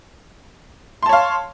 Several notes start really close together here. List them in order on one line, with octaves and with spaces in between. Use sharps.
C6 A5 C#5 F5